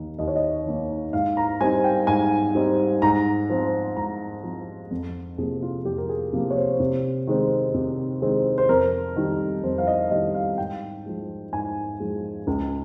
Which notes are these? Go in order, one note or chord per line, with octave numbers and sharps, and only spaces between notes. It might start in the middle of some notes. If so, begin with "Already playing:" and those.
Already playing: D#2 D#3 A#3 D#4
D#2 D#5
C#5
D#5
D#3 A#3 D#4
G#2 F5
A#5
G3 C4 D#4 G#5
G5
G#2 G#5
G3 C4 D#4
G#2 A#5
F3 C4
G#2 A#5
F3 C4
F2
C3 F3 A#3 G#4
F4
F2 G4
A#4
G#4
C3 F3 A#3
C#5
C5
C3
D#3 G#3 C4
C3
D#3 G#3 C4
C5
F2 A#4
D#3 G3
F2 C5
F5
D#5
D#3 G3 D#5
F5
G#2 G5
F3 G#3
G#2 G#5
F3 G#3
C#2